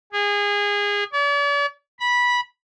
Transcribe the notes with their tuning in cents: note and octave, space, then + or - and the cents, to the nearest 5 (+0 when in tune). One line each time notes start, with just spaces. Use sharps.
G#4 -25
D5 -45
B5 -15